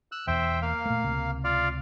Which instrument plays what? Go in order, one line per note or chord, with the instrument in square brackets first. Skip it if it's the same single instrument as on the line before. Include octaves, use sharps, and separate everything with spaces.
[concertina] E6 F#6
[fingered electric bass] E1 E2 [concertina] C5 E5 G5
[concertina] A#3 F5
[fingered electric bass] A#2 A3
C#2 C3
[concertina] F4 D5 F5